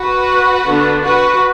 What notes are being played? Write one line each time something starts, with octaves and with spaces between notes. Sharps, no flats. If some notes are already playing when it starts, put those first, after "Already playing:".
Already playing: F#4 B4
D3 B3 D4
F#4 B4